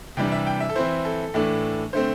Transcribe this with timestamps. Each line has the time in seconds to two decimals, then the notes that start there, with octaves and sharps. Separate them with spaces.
0.17 C3 E3 G3 D4 G5
0.32 E5
0.46 G5
0.60 E5
0.69 A4
0.76 E3 C4 E4 C5
1.05 A4
1.34 A2 E3 A3 D4
1.93 D3 A3 C4 C5